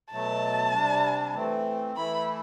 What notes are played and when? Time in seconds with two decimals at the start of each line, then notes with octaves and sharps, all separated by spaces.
0.11 B2 F#3 A3 A5
0.73 C3 G3 D4
1.35 E3 A3 C4
1.96 E3 A3 E4 B5